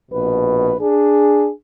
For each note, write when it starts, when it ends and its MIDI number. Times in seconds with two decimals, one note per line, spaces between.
0.11 0.75 34
0.11 0.75 47
0.11 0.75 71
0.80 1.50 62
0.80 1.50 68